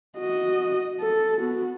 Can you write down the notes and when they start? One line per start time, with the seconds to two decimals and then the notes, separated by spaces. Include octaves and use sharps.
0.18 F#4 D#5
1.01 A4
1.39 B3 F#4